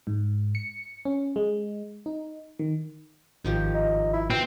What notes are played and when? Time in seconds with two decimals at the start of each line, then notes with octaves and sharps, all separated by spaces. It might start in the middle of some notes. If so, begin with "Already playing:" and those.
0.07 G#2
0.55 C#7
1.05 C#4
1.36 G#3
2.06 D#4
2.59 D#3
3.44 G#1 D#3 F3 G4
3.74 D#4
4.13 E4
4.30 E3 C4 F#4